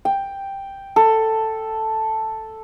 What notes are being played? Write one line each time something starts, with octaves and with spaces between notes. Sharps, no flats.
G5
A4